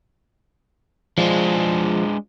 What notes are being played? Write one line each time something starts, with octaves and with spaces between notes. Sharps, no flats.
F3 G#3 D4